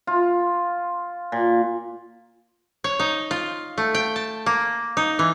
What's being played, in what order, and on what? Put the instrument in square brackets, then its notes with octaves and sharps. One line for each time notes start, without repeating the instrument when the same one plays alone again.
[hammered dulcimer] F4
A#2
[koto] C#5
D#4
F4
A3
G5
A5
A#3
D#4
E3